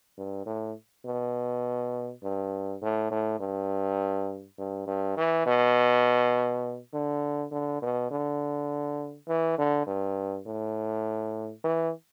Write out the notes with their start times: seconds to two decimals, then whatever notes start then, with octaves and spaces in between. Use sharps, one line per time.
0.17 G2
0.46 A2
1.06 B2
2.23 G2
2.82 A2
3.11 A2
3.40 G2
4.58 G2
4.87 G2
5.17 E3
5.46 B2
6.93 D3
7.51 D3
7.82 B2
8.11 D3
9.28 E3
9.58 D3
9.86 G2
10.46 A2
11.64 E3